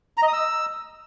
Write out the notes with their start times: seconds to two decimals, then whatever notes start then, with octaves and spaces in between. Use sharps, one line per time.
0.17 A#5
0.23 D#5
0.28 D#6
0.33 E6